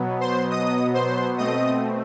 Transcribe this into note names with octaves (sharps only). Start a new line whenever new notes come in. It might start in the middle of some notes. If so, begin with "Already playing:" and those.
Already playing: B2 F#3 B3
C5 C6
D#5 D#6
C5 C6
B2 A3 C4 D#5 D#6